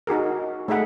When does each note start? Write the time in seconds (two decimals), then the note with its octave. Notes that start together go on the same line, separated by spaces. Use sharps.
0.07 D#4 F#4 G#4 A#4
0.68 A3 D#4 G#4 E5 F#5 B5